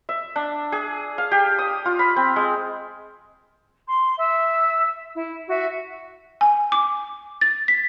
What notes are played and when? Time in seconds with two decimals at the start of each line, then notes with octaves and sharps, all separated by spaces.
0.09 E5
0.36 D4
0.72 G#4
1.18 F5
1.31 G4
1.58 D#6
1.86 F4
1.99 B5
2.16 C4
2.36 G#3
3.85 C6
4.17 E5 E6
5.13 E4
5.48 F#4 E5
6.41 G#5
6.72 D6
7.41 A6
7.68 B6